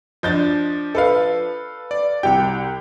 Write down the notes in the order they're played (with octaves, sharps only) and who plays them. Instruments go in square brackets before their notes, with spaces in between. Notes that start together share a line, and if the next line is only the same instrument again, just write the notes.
[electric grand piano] F3 D4 [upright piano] D#5 G6 A6
[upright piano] A4 B4 F5
[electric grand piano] D5
[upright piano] C2 G4 [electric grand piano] G5